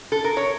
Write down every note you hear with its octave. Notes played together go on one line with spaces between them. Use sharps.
A4
A#4
C#5